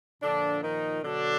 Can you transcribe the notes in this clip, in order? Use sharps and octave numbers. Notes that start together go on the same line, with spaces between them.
A#2 D3 F3 D4
D#3 D#4
B2 D3 F#3 D4